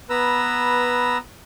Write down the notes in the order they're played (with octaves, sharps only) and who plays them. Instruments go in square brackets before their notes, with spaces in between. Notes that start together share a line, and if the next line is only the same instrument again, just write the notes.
[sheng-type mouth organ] B3 B4 A#5 E6